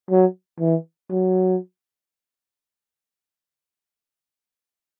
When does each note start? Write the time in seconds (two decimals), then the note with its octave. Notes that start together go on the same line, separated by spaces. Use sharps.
0.10 F#3
0.60 E3
1.10 F#3